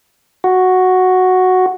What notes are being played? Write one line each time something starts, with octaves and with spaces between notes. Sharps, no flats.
F#4